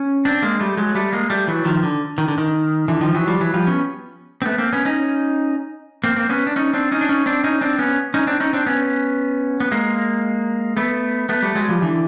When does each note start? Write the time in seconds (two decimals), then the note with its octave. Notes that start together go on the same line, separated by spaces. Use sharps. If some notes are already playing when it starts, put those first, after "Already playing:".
Already playing: C#4
0.25 C4 D4
0.42 G#3 A#3
0.60 G3 A3
0.77 F#3 G#3
0.95 G3 A3
1.12 G#3 A#3
1.30 G3 A3
1.48 E3 F#3
1.65 D#3 F3
1.83 D3
2.18 D#3
2.28 D3
2.38 D#3
2.88 D3 E3
3.01 D#3 F3
3.14 E3 F#3
3.27 F3 G3
3.40 E3 F#3
3.54 F3 G3
3.67 B3 C#4
4.42 C4
4.45 A3 B3
4.58 A#3 C4
4.73 B3 C#4
4.85 C#4 D#4
6.04 A#3 C4
6.16 A#3 C4
6.29 B3 C#4
6.47 D4
6.56 C#4 D#4
6.74 C4 D4
6.92 C#4 D#4
7.01 D4
7.09 C#4 D#4
7.26 C4 D4
7.44 C#4 D#4
7.61 C4 D4
7.79 B3 C#4
8.14 C#4 D#4
8.27 C4 D4
8.40 C#4 D#4
8.53 C4 D4
8.66 B3 C#4
9.60 B3
9.72 G#3 A#3
10.77 A3 B3
11.29 A3 B3
11.42 G3 A3
11.55 F#3 G#3
11.69 F3 G3
11.82 D3 E3